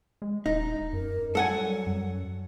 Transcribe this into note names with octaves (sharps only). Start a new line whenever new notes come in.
G#3
D#1 D#4
F#2 A#4
F#3 G3 A4 F#5 G#5
F#2